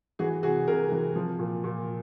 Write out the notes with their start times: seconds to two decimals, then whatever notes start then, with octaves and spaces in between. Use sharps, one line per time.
0.19 E3 F#4 G#4
0.43 C3 F#4 G#4
0.68 C3 G#4 A#4
0.92 E3
1.15 F3
1.39 A#2
1.64 A#2